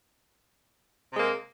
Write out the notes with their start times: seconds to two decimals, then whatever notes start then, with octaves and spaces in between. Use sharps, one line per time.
1.12 C3
1.15 G#3
1.17 A#3